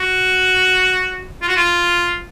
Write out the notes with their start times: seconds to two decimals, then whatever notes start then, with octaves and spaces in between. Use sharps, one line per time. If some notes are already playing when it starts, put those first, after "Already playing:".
Already playing: F#4
1.42 F4
1.48 F#4
1.56 F4